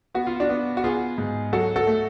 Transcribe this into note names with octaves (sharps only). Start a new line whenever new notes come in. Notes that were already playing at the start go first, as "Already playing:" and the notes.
B3 F#4
F4
D4 F#4
B3
F#4
B3 F4 G#4
G#2
F#3 F#4 A4
F#4 A4
A3